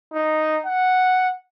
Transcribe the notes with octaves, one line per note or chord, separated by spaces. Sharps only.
D#4
F#5